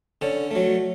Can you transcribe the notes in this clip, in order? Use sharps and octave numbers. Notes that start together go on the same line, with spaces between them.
D3 C#4
F#3 A3